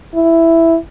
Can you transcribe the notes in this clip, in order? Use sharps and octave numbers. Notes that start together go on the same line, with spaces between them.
E4